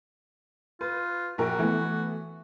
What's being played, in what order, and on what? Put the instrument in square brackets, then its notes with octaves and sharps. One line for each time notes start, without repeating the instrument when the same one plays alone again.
[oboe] F4 [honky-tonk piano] B4
[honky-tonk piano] A#1 A#4 G5 [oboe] F#4
[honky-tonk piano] E3 A3 B3